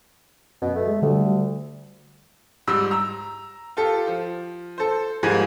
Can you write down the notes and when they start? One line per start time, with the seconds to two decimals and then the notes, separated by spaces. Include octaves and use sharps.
0.62 F#2 B2
0.75 A3
0.87 G#3
1.02 D2 D3 G3 A3
2.67 G#2 G3 E6
2.91 A#5 E6
3.77 F4 G4 A4
4.07 F3
4.78 A4 C5
5.23 G#2 F3 G3 A#3 G#4 G#5